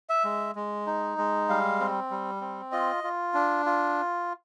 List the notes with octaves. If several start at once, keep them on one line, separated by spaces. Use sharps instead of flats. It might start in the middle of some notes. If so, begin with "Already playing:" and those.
E5
G#3
G#3
D#4
G#3
G3 F5
C4
G3
C4
F4 D#5
F4
D4
F4